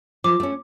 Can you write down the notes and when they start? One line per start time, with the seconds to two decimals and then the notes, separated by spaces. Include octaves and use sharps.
0.24 F3 D6
0.40 A3 C#4